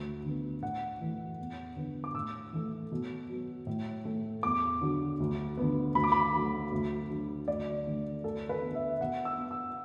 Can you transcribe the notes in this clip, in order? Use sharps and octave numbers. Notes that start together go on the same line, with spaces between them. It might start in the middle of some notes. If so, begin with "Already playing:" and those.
Already playing: D2
D3 B3
A2 F#5
E3 A3
E2
D3 B3
D6
A2 E6
E3 A3
B2
F#3 B3
A2
A3
E2 D6
D3 F#3
D2
D3 B3
D2 B5
D6
B5
D3 F#3 A3
D2
D3 F#3
D2 D5
D3 A3
D2 A4
B4
D3 B3
E5
B2 F#5
E6
B3
E6